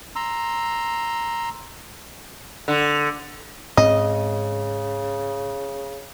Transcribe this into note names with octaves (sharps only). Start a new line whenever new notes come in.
A#5 C6 E6
D3
G#2 C#3 C4 D#5